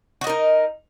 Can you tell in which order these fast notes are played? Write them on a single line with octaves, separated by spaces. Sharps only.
F#4 D#5 A#4 D#4